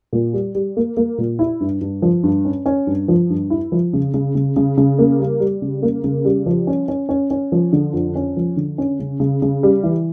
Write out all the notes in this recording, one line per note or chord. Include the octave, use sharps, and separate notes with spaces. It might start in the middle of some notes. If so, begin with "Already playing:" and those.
A#2
G3
G3
A#3
A#3
A#2
E4
G2
G2
F3
G2
C#4
C#4
G2
F3
G2
E4
F3
C#3
C#3
C#3
C#3
C#3
A#3
G3
G3
C#3
A#3
C#3
G3
F3
C#4
C#4
C#4
C#4
F3
D3
F2
C#4
F3
D3
C#4
C#3
C#3
C#3
G3
E3